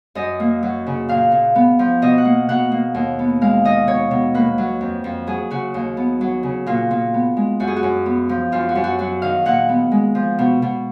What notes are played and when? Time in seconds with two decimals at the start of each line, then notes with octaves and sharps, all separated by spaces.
0.15 F#2 D#5
0.40 A#3
0.63 F#3
0.87 C#3
1.09 A#2 F5
1.32 A#2
1.55 B3
1.79 F3
2.02 B2 D#5
2.18 F#5
2.25 A#3
2.49 B2 F#5
2.72 A#3
2.94 D#2
3.19 B3
3.41 G#3 F5
3.65 D#3 D#5
3.87 B2 C#5
4.11 B2
4.34 A#3 B4
4.58 F#3
4.81 F2
5.04 F2
5.27 F#3 G#4
5.51 C#3 F#4
5.74 D#2
5.97 B3
6.21 F#3
6.43 C#3
6.66 A#2 F4
6.91 A#2
7.14 B3
7.37 G#3
7.60 F#2 F#4
7.68 G#4
7.76 F#4
7.83 F#2
8.06 B3
8.29 F3
8.52 F#2 F4
8.69 F#4
8.75 F#2
8.84 F#4
8.99 F#3 F#4
9.22 D#3 F5
9.45 A#2 F#5
9.69 B3
9.92 G#3
10.15 F3
10.39 B2
10.62 B2